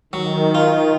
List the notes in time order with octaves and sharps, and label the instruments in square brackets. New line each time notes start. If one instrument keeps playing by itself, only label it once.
[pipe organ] D#3 [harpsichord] F#3
[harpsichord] F4